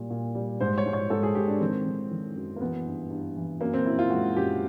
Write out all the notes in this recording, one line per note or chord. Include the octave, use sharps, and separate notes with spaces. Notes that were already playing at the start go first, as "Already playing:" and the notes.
Already playing: A#2 G3
A#2
G3
G#2 C5
C#5
G#2
C#5
G#2 A4
G#4
G#2 G4
D4
D#3 C4
D#3
D#3
F#2
A#3
E3 B3
G2
G2
E3
F#2 A#3
C4
F#2 E4
F4
G#3 F#4
F#2 G4